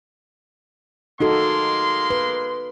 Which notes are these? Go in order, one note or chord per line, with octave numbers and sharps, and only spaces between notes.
G#3 A#3 D#4 F#4 A4 C6
B4